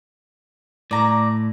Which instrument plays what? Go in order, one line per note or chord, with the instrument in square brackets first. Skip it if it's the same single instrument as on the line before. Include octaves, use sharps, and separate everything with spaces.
[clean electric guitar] A2 [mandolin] D5 A#5